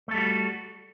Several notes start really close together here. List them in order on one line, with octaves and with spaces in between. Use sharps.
A3 A4 G3 F#4